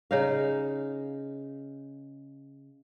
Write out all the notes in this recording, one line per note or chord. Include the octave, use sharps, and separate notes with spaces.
C#3 D#4 F5